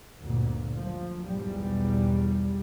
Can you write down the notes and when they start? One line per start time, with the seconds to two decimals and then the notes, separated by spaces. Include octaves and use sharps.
0.20 G1 D2 A#2
0.76 F3
1.24 B1 E2 G#2 B2 G3